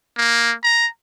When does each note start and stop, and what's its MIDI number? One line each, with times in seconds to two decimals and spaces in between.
0.17 0.53 58
0.64 0.87 82